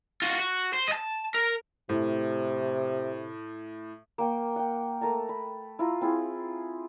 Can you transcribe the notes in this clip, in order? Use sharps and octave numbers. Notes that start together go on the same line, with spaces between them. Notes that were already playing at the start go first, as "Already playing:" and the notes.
F4 F#4
F#4
C5
D#5 A5
A#4
A2 C3
A#3 G5 C#6
F#5 G5
A3 A#4 A5 A#5
B5
E4 F4 A#5
C4 E4 F4 G#4